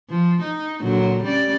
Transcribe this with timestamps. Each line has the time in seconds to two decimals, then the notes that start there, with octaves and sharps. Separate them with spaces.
0.10 F3
0.42 D#4
0.81 A#2 D3 F#3
1.23 G3 C#4 D5